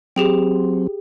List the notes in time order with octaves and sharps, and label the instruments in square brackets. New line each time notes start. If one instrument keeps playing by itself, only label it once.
[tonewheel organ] F#3 C4 [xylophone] G4 G#4 G5